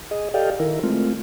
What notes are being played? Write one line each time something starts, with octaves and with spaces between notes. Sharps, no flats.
G#4 D#5
G4 A4 D5 D#5 F5 G5
D#3 E4 A#4
G#3 A3 C4 F4